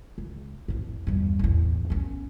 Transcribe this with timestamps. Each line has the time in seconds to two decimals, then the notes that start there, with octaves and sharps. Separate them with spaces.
0.18 C#2
0.68 F2 A2
1.07 E2 G2
1.39 A1 E2
1.90 B3 C#4